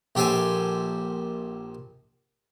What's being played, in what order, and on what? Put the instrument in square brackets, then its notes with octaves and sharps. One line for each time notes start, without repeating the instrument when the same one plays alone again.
[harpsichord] A#1 G4 A4 C5 G#5